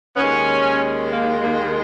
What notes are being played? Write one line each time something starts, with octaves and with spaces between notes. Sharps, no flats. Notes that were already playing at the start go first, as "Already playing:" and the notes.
B3
D#2 D#3 G#3 C#4
A#3
A#3